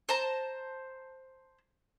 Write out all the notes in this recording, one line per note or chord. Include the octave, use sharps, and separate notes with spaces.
C5 A5 A#5